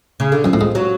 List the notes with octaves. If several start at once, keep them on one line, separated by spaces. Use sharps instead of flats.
C#3
D3
F#2 F3
A2
G#2
F#3